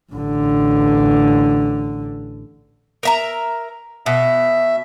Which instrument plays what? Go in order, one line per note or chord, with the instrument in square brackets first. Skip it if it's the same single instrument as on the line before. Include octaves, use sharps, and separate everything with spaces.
[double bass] A1 D3
[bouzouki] A#4 E5 A#5
[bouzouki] B2 [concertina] E5